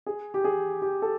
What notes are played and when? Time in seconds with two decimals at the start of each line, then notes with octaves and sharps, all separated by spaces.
0.06 G#4
0.34 G4
0.44 G#4
0.82 G4
1.02 A4